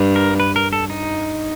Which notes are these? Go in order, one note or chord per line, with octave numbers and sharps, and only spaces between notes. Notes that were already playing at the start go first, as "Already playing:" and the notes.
Already playing: G2
A#4
B4
A#4
A4
D#4